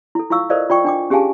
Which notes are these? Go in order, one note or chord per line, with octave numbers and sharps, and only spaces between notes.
E4 A4
E4 F4 F5 C#6 E6
A4 A#4 C5 D5 D#5 F5
F4 D5 G5 C#6
D4 G5 D6
C#4 G4 G#4 F5 G#5 A5